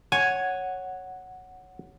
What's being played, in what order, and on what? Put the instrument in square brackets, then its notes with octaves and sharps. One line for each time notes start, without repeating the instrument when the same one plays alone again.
[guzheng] C#5 [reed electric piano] F#5 [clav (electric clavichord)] G#5